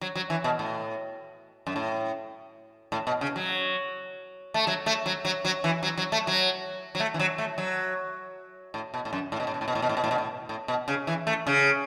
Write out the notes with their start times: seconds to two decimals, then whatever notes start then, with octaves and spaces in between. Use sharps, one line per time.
0.01 F#3
0.15 F#3
0.30 E3
0.44 B2
0.59 A2
1.67 F#2
1.76 A2
2.92 A2
3.07 B2
3.21 C#3
3.36 F#3
4.54 A3
4.67 F#3
4.86 A3
5.06 F#3
5.25 F#3
5.45 F#3
5.64 E3
5.83 F#3
5.98 F#3
6.12 A3
6.27 F#3
6.95 F#3
7.00 A3
7.14 E3
7.19 F#3
7.38 A3
7.58 F#3
8.74 A2
8.94 B2
9.05 A2
9.13 F#2
9.32 A2
9.40 B2
9.47 A2
9.54 B2
9.61 A2
9.68 B2
9.75 A2
9.82 B2
9.89 A2
9.97 B2
10.04 A2
10.11 B2
10.18 A2
10.49 A2
10.68 B2
10.88 C#3
11.07 E3
11.27 A3
11.47 C#3